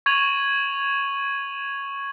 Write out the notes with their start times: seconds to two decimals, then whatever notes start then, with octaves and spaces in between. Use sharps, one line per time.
0.06 C#6 G#6 D#7 F7 F#7